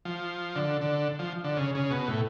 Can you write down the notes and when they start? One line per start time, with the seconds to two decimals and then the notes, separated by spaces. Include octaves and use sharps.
0.05 F3
0.56 D3
0.81 D3
1.19 F3
1.44 D3
1.57 C#3
1.75 C#3
1.91 B2
2.08 A2